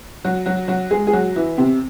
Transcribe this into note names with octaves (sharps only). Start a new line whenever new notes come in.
F#3 F#4
F#3 F#4
F#3 F#4
G#3 G#4
G#4
F#3 F#4
E3 E4
C3 C4